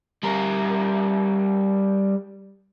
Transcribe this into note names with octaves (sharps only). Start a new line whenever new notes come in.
G3 A#4